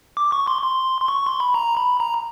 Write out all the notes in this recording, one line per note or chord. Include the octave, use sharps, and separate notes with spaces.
D6
C#6
C6
C6
C6
C#6
C6
B5
A#5
B5
A#5